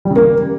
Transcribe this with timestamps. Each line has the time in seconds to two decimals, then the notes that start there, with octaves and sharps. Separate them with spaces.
0.05 G3
0.11 C#3
0.16 A#3